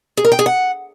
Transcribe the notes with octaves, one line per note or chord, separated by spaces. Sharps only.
G#4
A#4
G5
G#4
F#5